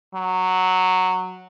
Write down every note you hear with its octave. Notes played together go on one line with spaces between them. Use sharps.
F#3